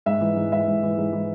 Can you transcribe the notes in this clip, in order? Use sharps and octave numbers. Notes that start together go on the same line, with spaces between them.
G#2 E5
E3
G#2
E3 E5
G#2
E3
G#2
E3